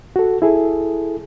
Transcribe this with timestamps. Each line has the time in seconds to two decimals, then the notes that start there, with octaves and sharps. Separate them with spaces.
0.16 F#4 A4
0.42 E4 G#4 A4